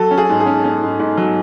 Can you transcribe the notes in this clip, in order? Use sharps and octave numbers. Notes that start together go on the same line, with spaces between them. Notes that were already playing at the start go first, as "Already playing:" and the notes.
Already playing: F#3 A4
C#4
G#4
G#2
G#4
C#4
C#4
G#2
G#2
F#3